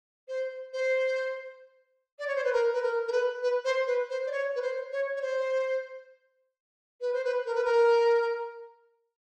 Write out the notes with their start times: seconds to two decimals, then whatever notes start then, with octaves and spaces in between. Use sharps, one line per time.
0.28 C5
0.73 C5
2.19 D5
2.27 C#5
2.35 C5
2.44 B4
2.52 A#4
2.73 B4
2.82 A#4
3.07 A#4
3.12 B4
3.42 B4
3.64 C5
3.86 B4
4.09 C5
4.26 D5
4.31 C#5
4.55 B4
4.61 C5
4.91 C#5
5.16 C#5
5.21 C5
7.01 B4
7.13 C5
7.24 B4
7.45 A#4
7.55 B4
7.64 A#4